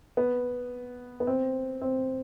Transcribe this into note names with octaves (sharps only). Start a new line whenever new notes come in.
B3
B3
C4
C4